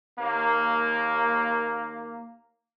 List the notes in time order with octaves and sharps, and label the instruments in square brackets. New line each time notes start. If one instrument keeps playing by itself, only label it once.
[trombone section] D#2 A#3